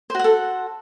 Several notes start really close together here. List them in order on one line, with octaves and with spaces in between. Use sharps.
C5 F#4 F#5 A4